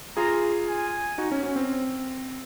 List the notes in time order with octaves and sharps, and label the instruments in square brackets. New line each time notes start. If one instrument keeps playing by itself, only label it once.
[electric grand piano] F4 G#4 [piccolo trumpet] A#5
[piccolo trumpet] G#5
[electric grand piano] D#4 F#4
C#4
C#4
C4